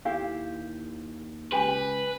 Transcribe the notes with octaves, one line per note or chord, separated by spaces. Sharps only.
D#2 E4 G4 F5
C#2 G4 B4 G5 G#5